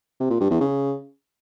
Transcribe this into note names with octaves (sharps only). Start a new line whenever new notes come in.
C3
A#2
G2
E2
C#3